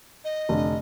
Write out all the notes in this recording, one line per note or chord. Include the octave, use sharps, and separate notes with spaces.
D#5
F1 D3